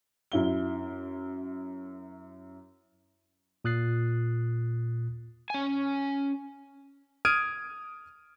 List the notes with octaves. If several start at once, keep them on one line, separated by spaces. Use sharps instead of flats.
F#2 E4 G7
A#2 D#6 F#6 A6 C7
C#4 G#5
D#6 F6 G#6 D7 D#7